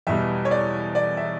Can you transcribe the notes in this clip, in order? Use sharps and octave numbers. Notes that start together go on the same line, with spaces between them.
E2 B2 G3 E5
C#5
D5
D5
E5